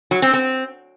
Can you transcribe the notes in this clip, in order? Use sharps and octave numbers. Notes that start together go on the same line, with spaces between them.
F#3
C4
C4